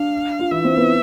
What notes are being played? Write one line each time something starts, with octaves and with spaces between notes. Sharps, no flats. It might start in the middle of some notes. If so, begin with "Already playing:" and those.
Already playing: D4 F5
F4
E3 E4 E5
C4 C5
B3 B4